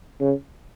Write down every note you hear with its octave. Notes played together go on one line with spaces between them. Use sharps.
C#3